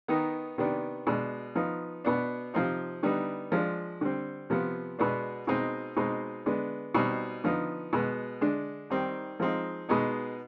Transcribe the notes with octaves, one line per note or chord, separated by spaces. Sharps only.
D#3 B3 D#4
C3 D#3 B3 D4
B2 G#3 D4
F3 B3 D#4
B2 B3 D4
C3 F3 C4 D#4
D3 G3 B3 D#4
F3 G#3 D4
D3 G3 C4
C3 F3 B3
B2 G#3 B3 D4
B2 G#3 C4 D#4
B2 G#3 C4 D#4
D3 G#3 B3 D4
B2 G3 C4 D#4
D3 F3 B3 D#4
B2 G#3 B3
D3 G#3 D4
D#3 G3 C4 D#4
F3 G#3 C4 D#4
B2 G#3 B3 D#4